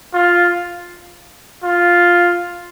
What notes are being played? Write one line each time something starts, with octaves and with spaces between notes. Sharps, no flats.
F4
F4